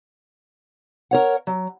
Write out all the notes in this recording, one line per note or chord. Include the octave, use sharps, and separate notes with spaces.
A#4 C#5 F#5
F#3